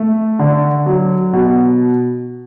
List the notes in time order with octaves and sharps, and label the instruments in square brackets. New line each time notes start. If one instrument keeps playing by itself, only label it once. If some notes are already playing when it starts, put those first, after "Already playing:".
Already playing: [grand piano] A3
D3
F#3
B2